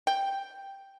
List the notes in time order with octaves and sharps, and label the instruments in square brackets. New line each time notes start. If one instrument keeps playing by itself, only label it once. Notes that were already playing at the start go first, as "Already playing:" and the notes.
[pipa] G5